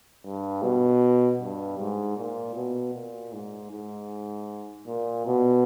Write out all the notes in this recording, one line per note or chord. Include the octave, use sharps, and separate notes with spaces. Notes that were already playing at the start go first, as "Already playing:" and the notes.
G2
B2
G2
G#2
A#2
B2
A#2
G#2
G#2
A#2
B2